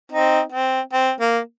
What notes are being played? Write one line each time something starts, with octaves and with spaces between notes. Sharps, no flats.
C4 D#4
C4
C4
A#3